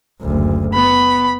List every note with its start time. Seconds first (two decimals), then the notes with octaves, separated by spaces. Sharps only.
0.21 F#1 D2
0.73 B3 B5